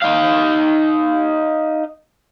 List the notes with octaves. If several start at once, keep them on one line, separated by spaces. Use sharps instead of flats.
D#4 F5